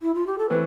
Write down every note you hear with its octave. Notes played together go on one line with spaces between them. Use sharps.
E4
F4
G4
A4
E3 A3 C4 B4